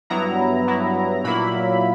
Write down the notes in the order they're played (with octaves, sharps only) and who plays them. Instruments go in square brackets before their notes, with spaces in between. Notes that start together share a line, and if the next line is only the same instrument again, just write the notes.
[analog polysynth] G2 F#3 B3 E4 A#5
G2 F#3 B3 E4
A#2 F#3 A#3 E4 B5